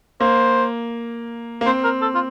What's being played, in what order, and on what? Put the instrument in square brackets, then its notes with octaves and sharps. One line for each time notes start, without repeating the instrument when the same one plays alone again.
[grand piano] A#3 [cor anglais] C5
[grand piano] A#3
[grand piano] C4 [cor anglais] C5
[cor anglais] A#4
A4
F4